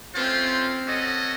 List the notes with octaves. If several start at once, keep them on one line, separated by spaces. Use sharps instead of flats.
A3 C4 C#4 F4 C5
C#4 F#4 A4 D#5